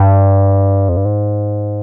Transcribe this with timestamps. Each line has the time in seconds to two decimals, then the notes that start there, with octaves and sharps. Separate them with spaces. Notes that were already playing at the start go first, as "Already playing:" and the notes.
Already playing: G2
0.89 F2
0.97 G2
1.05 G#2